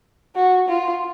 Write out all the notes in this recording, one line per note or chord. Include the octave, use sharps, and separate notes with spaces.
F#4
F4